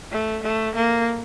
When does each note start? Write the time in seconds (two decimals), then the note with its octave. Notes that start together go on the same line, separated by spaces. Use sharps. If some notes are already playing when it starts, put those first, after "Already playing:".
0.12 A3
0.43 A3
0.75 A#3